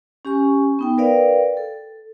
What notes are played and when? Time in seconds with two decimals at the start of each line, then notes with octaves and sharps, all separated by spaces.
0.25 C#4 G4 G#5 C#6
0.79 B3 D#4 G5
0.98 A#4 B4 D5 F5 G5
1.57 A4